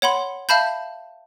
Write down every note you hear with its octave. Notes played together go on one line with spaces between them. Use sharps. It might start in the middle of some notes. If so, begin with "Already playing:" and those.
C#5 F#5 B5 C6
E5 F5 A5 B5 G6